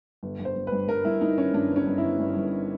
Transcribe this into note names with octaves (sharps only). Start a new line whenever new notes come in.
G1
G1
C5
G1
B4
G2
G2 A#4
G2 E4
G2 D#4
D#3 C#4
G2 D4
G1
C#4
G1
E4
G1
G2
G1